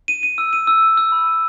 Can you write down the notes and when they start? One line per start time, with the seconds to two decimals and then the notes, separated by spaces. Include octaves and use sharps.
0.08 D#7
0.23 D#7
0.38 E6
0.53 D#7
0.67 E6
0.82 D#7
0.97 E6
1.12 B5
1.27 D#7